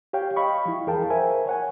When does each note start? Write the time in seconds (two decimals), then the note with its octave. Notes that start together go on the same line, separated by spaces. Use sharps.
0.13 G4 C#5 F5 G5
0.36 D#5 F5 B5 C#6
0.66 F3 E4
0.87 E2 G#4 A#4 F5 G5 A5
1.10 A#4 C5 E5 G#5
1.47 C#5 F#5 G#5